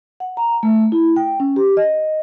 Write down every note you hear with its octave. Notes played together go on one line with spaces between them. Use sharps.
F#5
A#5
A3
E4
G5
C#4
G4
D#5